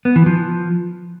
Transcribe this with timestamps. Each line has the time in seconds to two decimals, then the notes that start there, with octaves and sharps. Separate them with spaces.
0.05 B3
0.16 E3
0.26 F3